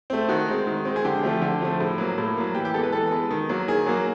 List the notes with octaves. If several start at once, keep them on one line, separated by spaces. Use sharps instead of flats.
A3 C4
D#3 F#4
G#3 C4
D#3
G#3 C4
G#4
D3 G4
F3 A3 C4
D3
F3 A3 C4
A2
F#3 A#3
A2
F#3 A#3
E3 G4
G4
G#3 B3 A4
B4
E3 A4
G#3 B3
D#3
F#3 A#3
D#3 G#4
F#3 A#3